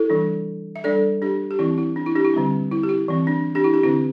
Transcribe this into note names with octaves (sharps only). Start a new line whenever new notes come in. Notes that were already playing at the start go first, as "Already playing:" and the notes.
Already playing: E4 A4
E3 G3 D4
E5
G3 D4 A4 D5
D4 G4
G4
E3 C4 E4
E4
D4
E4
D4 G4
E4
D3 G3 C4
E4
G4
E4
E3 C4
D4
D4 G4
E4
D4 G4
D3 C4 E4